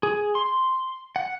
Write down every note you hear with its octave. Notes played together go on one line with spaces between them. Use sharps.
G#4
C6
F#5